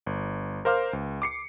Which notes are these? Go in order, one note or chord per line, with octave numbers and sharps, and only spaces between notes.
G1
A#4 C5 F5 D6 F6
C#2
D6 C7 C#7